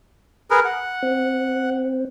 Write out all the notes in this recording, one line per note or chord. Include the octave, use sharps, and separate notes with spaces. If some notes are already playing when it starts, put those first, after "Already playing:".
G#4 A#4 B4
F#5
C4